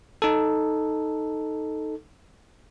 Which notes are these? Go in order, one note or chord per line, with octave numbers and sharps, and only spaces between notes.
D#4 A4